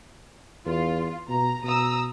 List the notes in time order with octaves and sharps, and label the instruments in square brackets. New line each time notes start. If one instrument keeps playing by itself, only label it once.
[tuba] E2 [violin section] F4
[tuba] B2 [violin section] A#5
[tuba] B2 [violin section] A#5 D#6 E6